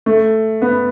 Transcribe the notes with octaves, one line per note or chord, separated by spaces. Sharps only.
A3
B3